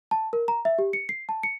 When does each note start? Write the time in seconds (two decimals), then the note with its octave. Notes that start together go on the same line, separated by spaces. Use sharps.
0.11 A5
0.33 A#4
0.48 A#5
0.65 E5
0.79 G4
0.93 C#7
1.09 C7
1.29 A5
1.43 C#7